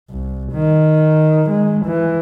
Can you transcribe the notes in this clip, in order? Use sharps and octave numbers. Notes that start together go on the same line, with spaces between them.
C2
D#3
G#3
E3